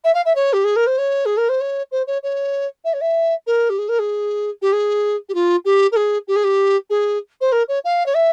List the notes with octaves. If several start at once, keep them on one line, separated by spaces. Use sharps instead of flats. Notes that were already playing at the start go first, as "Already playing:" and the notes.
E5
F5
E5
C#5
G4
G#4
A#4
C5
C#5
G#4
A#4
C5
C#5
C5
C#5
C#5
E5
C#5
E5
A#4
G4
G#4
A#4
G#4
G4
G#4
G4
F4
G4
A#4
G#4
G4
G#4
G4
G#4
C5
A#4
C#5
F5
C#5
E5